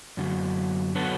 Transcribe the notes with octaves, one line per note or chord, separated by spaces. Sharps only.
F#2 D3 F#3
D3 F#3 B3 F#4 A4